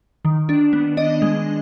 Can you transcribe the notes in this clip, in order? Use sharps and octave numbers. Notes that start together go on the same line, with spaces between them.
D#3
D4
B3
D4 D#5
G#3